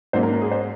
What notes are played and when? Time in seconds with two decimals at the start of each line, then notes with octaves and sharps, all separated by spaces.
0.13 G#2 F#3 A#3 C#4 C5
0.23 A#4
0.33 A#4
0.42 G#4
0.51 C5